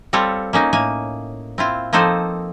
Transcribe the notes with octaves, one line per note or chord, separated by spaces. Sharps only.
G3 C4 F4 A4 C#5
A#3 C#4 D#4
A2 A#3 G#5
C4 E4 F4
F3 A#3 C4 D#4 A4 C5